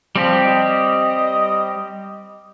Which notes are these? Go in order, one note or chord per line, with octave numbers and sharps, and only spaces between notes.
F3 G3 C4 G4
D#5